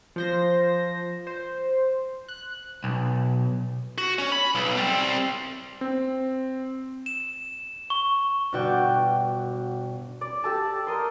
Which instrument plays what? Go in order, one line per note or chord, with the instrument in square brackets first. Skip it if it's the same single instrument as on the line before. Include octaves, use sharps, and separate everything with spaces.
[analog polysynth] F3 C5 A#6
C5
F#6
[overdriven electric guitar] B1
[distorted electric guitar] F#4
C#4
B5
B1
G3 C4
[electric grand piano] C4
[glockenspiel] E7
C#6
[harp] G1 B2 F#4 D5 G5
[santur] D5
G4 A4 A5
A#4 D#5 C6